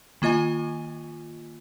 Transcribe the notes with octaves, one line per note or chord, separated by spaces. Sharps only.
D#3 A#3 F4 D#5 G#5